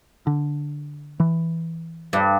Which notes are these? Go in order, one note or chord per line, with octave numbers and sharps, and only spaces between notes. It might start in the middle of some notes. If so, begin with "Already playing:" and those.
D3
E3
G2